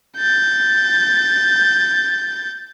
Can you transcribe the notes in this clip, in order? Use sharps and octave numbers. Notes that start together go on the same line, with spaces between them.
G6 A6